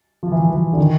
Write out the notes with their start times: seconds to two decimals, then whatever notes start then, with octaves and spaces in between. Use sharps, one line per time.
0.23 F3
0.32 E3
0.40 F3
0.50 E3
0.73 D3
0.78 D#3